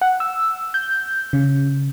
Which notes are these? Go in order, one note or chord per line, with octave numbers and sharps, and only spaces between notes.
F#5
E6
G6
C#3